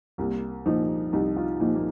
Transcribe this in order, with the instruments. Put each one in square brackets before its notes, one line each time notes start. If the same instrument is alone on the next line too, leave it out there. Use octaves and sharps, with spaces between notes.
[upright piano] C2 A#3
A#2 F3 D#4
C2 D#4
F4
A#2 F3 D#4
A#3